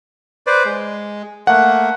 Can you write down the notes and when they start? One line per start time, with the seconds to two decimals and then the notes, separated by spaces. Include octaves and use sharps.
0.47 B4 C5 D5
0.65 G#3
1.47 A3 A#3 F#5